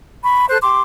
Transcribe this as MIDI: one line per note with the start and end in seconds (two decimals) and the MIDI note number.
0.23 0.45 83
0.23 0.45 85
0.49 0.58 69
0.49 0.58 72
0.49 0.58 90
0.62 0.82 67
0.62 0.82 84
0.62 0.82 86